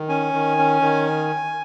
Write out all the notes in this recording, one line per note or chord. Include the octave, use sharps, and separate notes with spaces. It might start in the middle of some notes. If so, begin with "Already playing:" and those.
Already playing: D#3
C#4 G#5
D#3
C#4
D#3